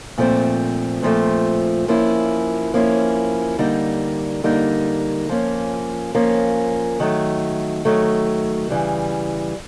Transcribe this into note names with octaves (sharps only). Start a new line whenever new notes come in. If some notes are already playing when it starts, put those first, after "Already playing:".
A#2 F3 A3 C4
A#2 F3 A3 C4
F3 A#3 C#4 E4
F3 A#3 C#4 E4
D3 G3 A#3 D#4
D3 G3 A#3 D#4
F3 A#3 C#4
F3 A#3 C#4
D#3 F#3 A3
D#3 F#3 A3
C#3 E3 G3